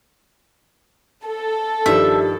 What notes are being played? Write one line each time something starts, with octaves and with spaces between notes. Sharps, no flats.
A4
G2 D#3 F3 G4 E5